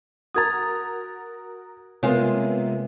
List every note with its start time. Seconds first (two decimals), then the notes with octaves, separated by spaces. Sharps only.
0.34 F#4 A#4 A#5 D#6 G#6 A6
2.03 C3 G#3 A#3 B3 F4 C#5 G#5